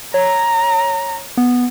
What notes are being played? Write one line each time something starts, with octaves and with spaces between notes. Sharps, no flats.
C#5 A#5
B3